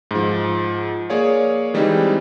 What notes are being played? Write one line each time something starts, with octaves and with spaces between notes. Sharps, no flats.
G#2 F3
A#3 G#4 C#5 D5 F5
E3 G3 G#3 C4 D#4